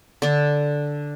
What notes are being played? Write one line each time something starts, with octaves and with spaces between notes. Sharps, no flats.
D3 D4 A4